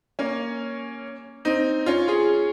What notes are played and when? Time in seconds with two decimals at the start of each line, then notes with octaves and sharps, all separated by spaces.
0.19 A#3 C#4
1.45 C4 D#4
1.86 C#4 F4
2.08 F4 G#4